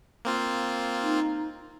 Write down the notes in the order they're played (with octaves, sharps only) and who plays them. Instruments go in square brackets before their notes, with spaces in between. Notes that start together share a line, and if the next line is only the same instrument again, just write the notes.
[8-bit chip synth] A#3 C4 F4
[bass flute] D#4